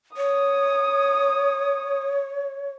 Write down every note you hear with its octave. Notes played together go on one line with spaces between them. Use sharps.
C#5 D#6